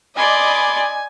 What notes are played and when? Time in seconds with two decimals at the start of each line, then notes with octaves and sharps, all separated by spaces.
0.16 D5 D#5 G#5 B5 C6 D6